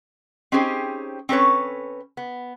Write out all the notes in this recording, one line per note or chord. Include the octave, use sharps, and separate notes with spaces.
C4 C#4 D#4 G4 G#4 C5
C4 C#4 A4 B4 C#5
B3